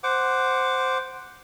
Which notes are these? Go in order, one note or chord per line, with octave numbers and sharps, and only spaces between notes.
C5 F#5 D6